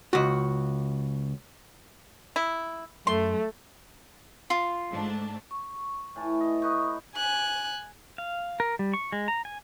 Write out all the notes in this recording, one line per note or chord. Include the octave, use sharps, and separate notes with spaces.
C#2 F#4
E4
F#2 A3 C6
F4
G#2 A3 D4
C#6
A2 E3 A5
D#5
D#4 B4 D#5 C#6 D#6
G#5 F#6
F5
A#4
G3
C#6
G#3
A#5
G#5